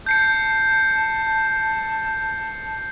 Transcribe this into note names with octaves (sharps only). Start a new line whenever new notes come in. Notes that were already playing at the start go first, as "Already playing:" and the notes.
A5 G6 C7 C#7